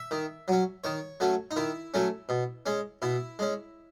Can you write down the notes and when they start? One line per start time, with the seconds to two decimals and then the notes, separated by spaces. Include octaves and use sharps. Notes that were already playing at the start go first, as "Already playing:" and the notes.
Already playing: E5
0.11 D#3
0.48 F#3 C#4
0.84 D#3 C#5
1.20 F#3 A3 C#4
1.51 D#4
1.56 D#3 E4
1.94 F#3 A3 C#4
2.29 B2
2.66 G#3 C#4
3.02 B2 E4
3.39 G#3 C#4